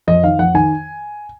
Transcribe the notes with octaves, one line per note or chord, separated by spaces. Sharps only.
F2 D#5
D#3 F5
F2 F#5
D#3 G#5